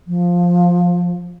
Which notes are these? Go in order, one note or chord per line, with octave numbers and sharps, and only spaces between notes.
F3